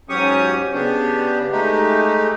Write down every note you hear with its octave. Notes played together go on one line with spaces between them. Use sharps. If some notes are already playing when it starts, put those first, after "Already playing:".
G#2 F#3 C#4 G4 C#6 D#6
C#3 B3 D4 G4
G#3 A3 D#4 G4